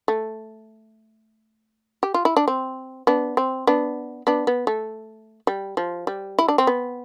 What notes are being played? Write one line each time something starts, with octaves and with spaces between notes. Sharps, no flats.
A3
G4
F4
E4
D4
C4
B3 D4
C4
B3 D4
B3 D4
B3
A3
G3
F3
G3
E4
D4
C4
B3